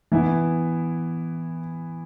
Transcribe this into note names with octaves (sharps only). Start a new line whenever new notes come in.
E3 B3 E4